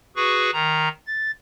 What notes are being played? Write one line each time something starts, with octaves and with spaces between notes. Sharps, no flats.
F#4 G#4 B4 C#6
D#3 A#5
A6